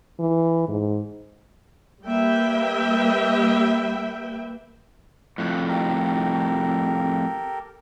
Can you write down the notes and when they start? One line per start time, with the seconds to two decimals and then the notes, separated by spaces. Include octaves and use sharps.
0.20 E3
0.68 G#2
2.05 G3 A#3 B4 E5 G5
5.38 F2 A2 F#6
5.68 G4 A4 A#4